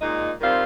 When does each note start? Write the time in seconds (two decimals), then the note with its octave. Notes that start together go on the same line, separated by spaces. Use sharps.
0.01 A#2 G#3 D#4
0.41 D#3 G3 C4 F4